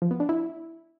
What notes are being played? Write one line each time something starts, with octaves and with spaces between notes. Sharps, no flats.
F3
B3
D4
E4